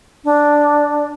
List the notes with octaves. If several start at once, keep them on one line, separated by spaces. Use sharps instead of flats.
D4